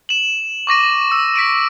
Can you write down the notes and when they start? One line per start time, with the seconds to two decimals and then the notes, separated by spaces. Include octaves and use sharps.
0.09 E7 F#7
0.67 C#6 D6 A#6 D#7
1.12 E6
1.36 B6 D7 D#7